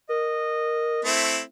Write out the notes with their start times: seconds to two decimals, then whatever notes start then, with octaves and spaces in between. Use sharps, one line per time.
0.09 A#4 D#5
1.05 A3 C4 E4